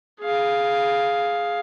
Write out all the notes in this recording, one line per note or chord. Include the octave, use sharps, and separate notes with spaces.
G#4 F5